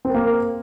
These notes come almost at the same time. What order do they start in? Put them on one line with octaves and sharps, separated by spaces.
C4 A#4 A#3